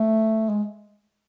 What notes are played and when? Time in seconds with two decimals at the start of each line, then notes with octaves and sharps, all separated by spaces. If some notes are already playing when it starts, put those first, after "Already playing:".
Already playing: A3
0.49 G#3